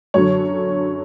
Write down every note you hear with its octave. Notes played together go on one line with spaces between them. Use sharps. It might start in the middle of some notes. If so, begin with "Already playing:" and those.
F#2 D3 F#3 C#5